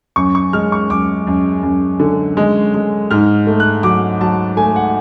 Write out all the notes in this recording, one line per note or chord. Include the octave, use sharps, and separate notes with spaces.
F#2 C#6
C#6
G#3 F6
C#6
F#2 D6
F#2
F#2
D3
G#3
G#3
G#2 F6
A3
F#6
F#3 D6
F#3 A5
A3 G#5
F#5